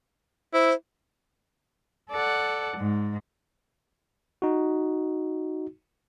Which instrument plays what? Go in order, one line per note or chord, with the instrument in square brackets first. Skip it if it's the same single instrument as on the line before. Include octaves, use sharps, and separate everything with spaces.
[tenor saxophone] E4 [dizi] C5
[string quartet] A4 D5 F#5
G#2
[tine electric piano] D#4 F#4